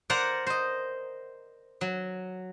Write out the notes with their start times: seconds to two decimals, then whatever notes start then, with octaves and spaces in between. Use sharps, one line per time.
0.10 A#4 C5 D5 F#5 A#5
0.47 C5 D#5
1.81 F#3